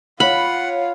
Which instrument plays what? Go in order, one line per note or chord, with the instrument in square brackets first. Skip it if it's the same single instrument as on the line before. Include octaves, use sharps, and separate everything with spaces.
[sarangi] F4 [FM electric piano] C#5 F5 [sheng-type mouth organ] F#5 [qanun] B5